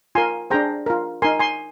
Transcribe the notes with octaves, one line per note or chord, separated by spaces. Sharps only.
F4 A#4 G#5 C6
D4 G#4 C5 G5 A#5
F4 A#4
D#4 A#4 G#5 C6
G#5 C6